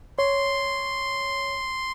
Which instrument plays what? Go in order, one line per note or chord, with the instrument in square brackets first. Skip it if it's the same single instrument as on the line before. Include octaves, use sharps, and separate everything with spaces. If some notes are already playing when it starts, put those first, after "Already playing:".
[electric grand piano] C#5 [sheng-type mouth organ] C6